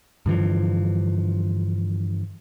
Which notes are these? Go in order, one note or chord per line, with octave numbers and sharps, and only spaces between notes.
G2 D3 E3 F3